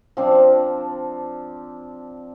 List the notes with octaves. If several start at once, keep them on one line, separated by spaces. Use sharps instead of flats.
F3 C4 D4